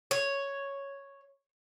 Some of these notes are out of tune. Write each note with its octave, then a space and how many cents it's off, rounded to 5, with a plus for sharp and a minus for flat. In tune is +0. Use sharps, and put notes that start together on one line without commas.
C#5 +0